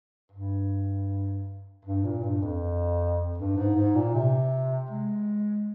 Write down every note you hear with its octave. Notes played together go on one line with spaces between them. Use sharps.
G2
G2
A#2
G2
F2
G2
G#2
G#2
A#2
C3
G#3